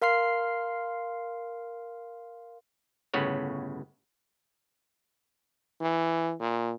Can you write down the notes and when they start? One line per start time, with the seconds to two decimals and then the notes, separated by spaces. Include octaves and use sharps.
0.02 A#4 F5 C6 F6 C7
3.14 G1 A2 C#3 B3 C#5
5.81 E3
6.40 A#2